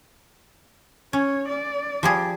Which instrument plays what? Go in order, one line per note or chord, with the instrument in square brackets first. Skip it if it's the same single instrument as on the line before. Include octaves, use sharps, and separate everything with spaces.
[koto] C#4 [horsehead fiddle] C#5
[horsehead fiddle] D5
[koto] F3 G3 G#4